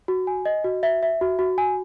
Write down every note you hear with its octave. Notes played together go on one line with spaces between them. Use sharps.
F#4
G#5
D#5
F#4
E5
E5
F#4
F#4
G#5